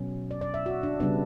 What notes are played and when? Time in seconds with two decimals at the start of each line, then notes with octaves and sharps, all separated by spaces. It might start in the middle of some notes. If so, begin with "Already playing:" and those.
Already playing: B2 F#3 C#4
0.31 D5
0.41 D5
0.54 E5
0.66 F#4
0.83 D4
1.00 C#3 G3 B3 D4